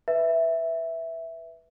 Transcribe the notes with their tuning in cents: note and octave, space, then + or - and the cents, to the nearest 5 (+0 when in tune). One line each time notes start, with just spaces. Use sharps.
B4 +0 E5 +0